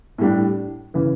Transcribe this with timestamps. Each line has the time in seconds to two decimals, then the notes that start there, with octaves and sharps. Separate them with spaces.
0.18 A2 G3 D4
0.94 C#3 E3